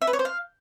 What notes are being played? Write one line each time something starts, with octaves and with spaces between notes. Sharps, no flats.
E5
B4
C#5
C5
F5